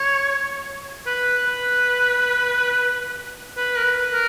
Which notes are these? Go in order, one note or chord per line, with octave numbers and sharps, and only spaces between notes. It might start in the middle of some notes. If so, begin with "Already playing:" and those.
Already playing: C#5
B4
B4
B4
A#4
B4
A#4